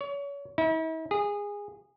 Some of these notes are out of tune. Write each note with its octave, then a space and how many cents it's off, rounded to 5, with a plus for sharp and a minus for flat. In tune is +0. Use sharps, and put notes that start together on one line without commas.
C#5 +30
E4 -45
G#4 -20